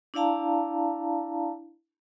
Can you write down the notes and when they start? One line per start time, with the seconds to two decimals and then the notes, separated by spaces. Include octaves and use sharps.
0.14 D4 E4 D5 F5 A5 A#5